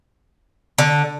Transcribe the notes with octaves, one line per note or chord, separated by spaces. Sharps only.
D3